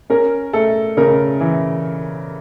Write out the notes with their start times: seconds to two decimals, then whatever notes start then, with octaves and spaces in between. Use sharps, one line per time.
0.10 C#4 A#4
0.53 A3 A4
0.97 C#3 A#4
1.41 E3